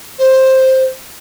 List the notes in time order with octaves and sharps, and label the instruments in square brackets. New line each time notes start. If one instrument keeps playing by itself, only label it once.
[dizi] C5